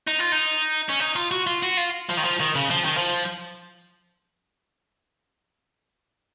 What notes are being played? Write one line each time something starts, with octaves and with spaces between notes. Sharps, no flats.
D#4
F4
D#4
C#4
D#4
F4
F#4
F4
F#4
F4
F3
D#3
F3
D#3
C#3
F3
D#3
F3